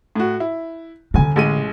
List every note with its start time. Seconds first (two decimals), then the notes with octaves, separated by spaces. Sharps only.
0.16 A2 F#4
0.40 E4
1.14 D#1 D3 D4 G#5
1.36 A1 G#3 D#7